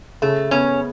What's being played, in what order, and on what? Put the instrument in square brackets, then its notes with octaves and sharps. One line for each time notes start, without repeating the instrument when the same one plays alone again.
[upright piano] C#3 [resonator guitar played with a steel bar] A3
[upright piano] B3 [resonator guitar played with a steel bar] C#4